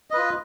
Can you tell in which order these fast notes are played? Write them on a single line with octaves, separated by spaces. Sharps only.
D#5 B4 F4